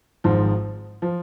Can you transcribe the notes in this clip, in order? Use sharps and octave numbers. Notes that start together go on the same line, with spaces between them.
G#1 G#2 F3
F3